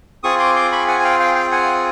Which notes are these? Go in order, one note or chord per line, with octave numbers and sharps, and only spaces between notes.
C4 F4 G#4 C#6 D#6
C6 D6
C6 D6
B5 C#6
F#5 G#5
G#5
F5 G5
F5 G5
F5 G5
F#5 G#5